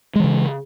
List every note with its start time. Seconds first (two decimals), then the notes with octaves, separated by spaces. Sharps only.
0.16 G#3
0.20 E3
0.24 C#3